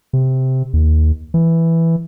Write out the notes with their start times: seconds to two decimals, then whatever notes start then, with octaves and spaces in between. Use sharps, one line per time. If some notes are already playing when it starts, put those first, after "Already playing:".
0.13 C3
0.73 D#2
1.34 E3